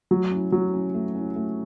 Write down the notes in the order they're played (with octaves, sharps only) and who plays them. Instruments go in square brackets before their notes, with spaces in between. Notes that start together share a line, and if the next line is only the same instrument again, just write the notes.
[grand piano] F#3 [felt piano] A3
[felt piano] C#4 E4
[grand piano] F#3 [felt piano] A3
[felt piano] C#4 E4
A3
C#4 E4
A3